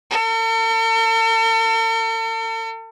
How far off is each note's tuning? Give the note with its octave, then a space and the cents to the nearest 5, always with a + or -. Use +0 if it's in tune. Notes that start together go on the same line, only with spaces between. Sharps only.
A4 +45